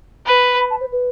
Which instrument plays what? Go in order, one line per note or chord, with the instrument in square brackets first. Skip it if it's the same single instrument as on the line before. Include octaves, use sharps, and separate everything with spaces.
[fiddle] B4
[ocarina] B5
A5
C5
B4